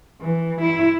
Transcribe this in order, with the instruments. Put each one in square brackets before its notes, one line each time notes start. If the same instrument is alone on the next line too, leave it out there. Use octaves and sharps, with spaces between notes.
[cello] E3
E4